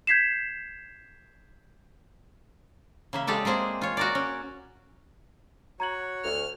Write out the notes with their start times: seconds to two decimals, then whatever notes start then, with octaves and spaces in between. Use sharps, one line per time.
0.07 G6 G#6 B6 C7 E7
3.13 C#3 A#3 E5
3.27 G#3 G4 A4 D5
3.45 G#3 A#3 C4 G#4
3.81 F4 C#5
3.97 F#4 A#4 D5
4.15 C#4
5.80 F#4 C#5 A#5 G#6 F#7
6.24 D2 F6